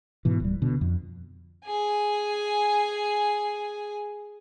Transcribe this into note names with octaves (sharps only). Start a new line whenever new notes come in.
G#2 B2 E3
D1 G3
B2 D3
F2
G#4 G#5